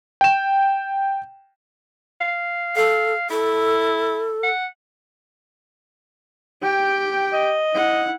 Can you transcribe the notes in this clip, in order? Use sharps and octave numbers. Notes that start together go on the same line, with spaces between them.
G5 E7
F5
A4 F5
E4 A4
F#5
G4 G5
D#5
E4 F#5